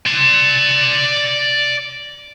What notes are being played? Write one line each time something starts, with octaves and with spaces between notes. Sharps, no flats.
D5 C6